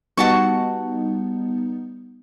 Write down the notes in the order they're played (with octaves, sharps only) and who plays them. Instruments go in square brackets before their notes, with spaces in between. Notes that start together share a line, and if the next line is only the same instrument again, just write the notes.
[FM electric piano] G3 B3 D#4 [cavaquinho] F#4 A5 C#6